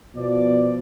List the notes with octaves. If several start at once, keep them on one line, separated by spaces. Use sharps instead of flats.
B2 F3 D5